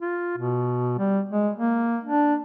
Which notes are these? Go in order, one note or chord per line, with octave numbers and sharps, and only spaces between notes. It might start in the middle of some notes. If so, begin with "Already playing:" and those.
F4
B2
G3
G#3
A#3
D4